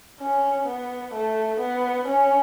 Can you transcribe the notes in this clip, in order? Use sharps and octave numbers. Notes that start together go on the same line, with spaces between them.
C#4
B3
A3
B3
C#4